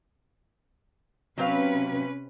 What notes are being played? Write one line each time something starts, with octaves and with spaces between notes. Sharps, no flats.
C3 F#3 C4 C#4 B4 F5